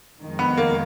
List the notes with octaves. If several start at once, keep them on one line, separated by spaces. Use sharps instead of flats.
F2 D#3 G#3
B3
A#3